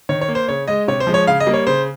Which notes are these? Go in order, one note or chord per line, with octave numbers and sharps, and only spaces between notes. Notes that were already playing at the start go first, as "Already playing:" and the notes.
D#3 C#5
C#5
A#3
C5
C#3 C#5
G#3 D#5
C3 C#5
C5
F3 G#3
C#5
C#3 F5
D#5
G3 A#3
C#5
C#3 C5